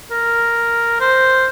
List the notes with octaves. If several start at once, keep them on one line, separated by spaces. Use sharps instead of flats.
A#4
C5